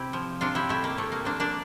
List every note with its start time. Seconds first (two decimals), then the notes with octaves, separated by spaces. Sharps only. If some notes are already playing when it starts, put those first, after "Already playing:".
Already playing: C3 E4 G4
0.13 F3
0.41 C3 D4 F4
0.55 E4 G4
0.69 A3 E4 G4
0.84 A#3
0.97 C3 A3
1.12 A#3
1.25 F3 A#3 D4
1.40 A#3 D4